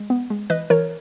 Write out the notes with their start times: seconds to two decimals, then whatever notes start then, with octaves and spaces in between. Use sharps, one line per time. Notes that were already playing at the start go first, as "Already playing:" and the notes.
Already playing: G#3
0.10 B3
0.30 G#3
0.50 E3 B4 D#5
0.70 E3 A#4 C#5